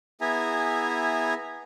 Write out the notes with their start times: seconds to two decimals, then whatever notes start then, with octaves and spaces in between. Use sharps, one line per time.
0.21 B3 E4 G#4 E5 G#5 A#5